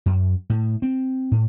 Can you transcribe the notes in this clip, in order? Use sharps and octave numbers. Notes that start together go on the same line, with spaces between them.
F#2
A2
C4
A2